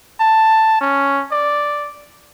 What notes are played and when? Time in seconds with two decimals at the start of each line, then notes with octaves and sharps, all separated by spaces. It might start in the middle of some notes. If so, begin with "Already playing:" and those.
0.20 A5
0.81 C#4
1.31 D5